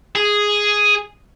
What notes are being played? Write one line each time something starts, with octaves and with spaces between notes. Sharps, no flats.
G#4